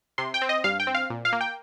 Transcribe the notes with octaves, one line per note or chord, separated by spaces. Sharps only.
C3 C6
G5
C4
D#5
G2 F5
G5
C4
F5
A#2
F5
A#3
G5